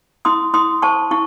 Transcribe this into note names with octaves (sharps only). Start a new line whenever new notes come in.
E4 C6 D#6
E4 C6 D#6
C5 A5 C#6
E4 C#6